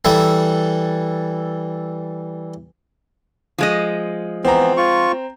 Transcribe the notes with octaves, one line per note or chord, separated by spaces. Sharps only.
E3 G3 A4 E5
F3 G#3 D#5
E3 B3 C4 A#5
F4 C#6